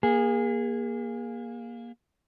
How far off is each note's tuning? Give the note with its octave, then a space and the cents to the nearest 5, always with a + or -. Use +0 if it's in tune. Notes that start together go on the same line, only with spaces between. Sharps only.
A#3 +20 G#4 -25